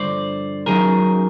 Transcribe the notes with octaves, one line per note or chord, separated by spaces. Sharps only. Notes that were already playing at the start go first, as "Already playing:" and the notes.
Already playing: G2 D3 F3 C5 D5
F#2 D#3 F#3 G#4 A#4